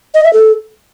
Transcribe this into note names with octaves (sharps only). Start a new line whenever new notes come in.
D#5
E5
A4